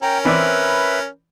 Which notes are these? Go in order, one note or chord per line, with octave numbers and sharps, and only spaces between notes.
C#4 A#4 G5 A#5
E3 C4 B4 D5 E5 B5